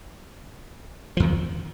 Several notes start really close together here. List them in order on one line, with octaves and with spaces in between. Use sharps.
F3 E2 D#3